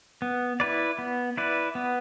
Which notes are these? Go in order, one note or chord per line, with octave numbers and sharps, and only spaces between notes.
B3
E4 B4 D5
B3
E4 B4 D5
B3